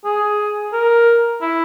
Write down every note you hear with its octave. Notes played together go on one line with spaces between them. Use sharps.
G#4
A#4
E4